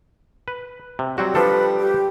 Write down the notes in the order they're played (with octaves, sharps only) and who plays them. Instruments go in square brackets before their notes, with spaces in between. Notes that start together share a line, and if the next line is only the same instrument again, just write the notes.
[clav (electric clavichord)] B4
C3
[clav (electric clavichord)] F#3 C4 F#4 [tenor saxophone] G3
[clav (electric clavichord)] F3 D4 A4 [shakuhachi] B4
[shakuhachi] G4